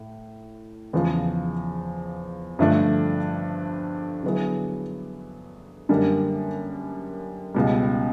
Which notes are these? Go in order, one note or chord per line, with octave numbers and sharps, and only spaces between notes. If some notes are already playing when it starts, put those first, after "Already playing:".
Already playing: A2
E2 C#3 F3
G2 D3 F3 A3 D4
D3 F#3 B3 E4 G#4
F#2 D3 G3 A#3 D4
C#2 B2 G3